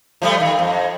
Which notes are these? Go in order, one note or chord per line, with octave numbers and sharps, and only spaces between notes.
F3 G3 A3
D#3
F2